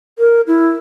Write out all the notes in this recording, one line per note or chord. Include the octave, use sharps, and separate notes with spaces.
A#4
E4